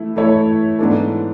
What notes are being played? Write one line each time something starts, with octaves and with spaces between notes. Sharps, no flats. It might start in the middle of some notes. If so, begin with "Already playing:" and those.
Already playing: E3 A3 E4
E3 A3 E4 A4 C#5
G#2 E3 B3 D4 A4